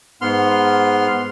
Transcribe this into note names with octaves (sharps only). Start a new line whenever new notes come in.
G#2 B3 C6 F6